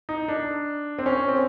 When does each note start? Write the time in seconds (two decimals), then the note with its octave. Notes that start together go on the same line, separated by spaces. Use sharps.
0.09 D#4
0.28 D4
0.99 C4
1.06 C#4
1.28 C4